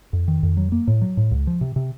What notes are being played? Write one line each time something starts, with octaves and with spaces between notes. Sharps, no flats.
F2
D#3
F2
F#3
A#3
A2
F#3
A2
C#2
F3
C3
C3